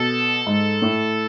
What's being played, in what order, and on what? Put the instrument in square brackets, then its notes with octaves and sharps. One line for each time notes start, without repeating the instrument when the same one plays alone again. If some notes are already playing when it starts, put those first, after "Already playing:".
Already playing: [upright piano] B2 [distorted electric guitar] A4
[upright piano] G#2
A2